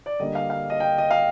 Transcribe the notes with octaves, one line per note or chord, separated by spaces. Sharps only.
D5
D3 G3 A#3 D#5
F5
F5
D#5
G5
D#5
F5